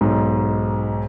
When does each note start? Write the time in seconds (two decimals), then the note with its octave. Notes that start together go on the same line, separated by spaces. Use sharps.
0.01 B1 G#2